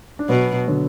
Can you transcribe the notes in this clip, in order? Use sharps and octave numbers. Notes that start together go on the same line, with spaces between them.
D4
B2 F#3 B3
D3 F#3